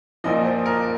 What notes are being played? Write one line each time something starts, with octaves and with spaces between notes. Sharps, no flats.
A#1 A#2 F3 D#5
C5
A#4